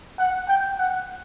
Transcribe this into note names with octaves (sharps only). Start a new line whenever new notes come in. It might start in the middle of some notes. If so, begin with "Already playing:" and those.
F#5
G5
F#5